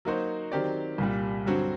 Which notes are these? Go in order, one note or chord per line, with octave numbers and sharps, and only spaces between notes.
F#3 A#3 D#4 F#4 C5
D#3 F#3 C4 G4 D5
C2 A#2 G3
G2 D3 F#3 C4 F#4